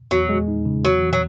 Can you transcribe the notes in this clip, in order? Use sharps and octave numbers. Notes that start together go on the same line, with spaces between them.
E2 F#3
G#3
D#4
C#3
E2 F#3
E3
F#3